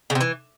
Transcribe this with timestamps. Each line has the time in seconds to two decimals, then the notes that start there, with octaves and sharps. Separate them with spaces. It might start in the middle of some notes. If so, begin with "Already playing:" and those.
0.10 C#3
0.15 C3
0.21 E3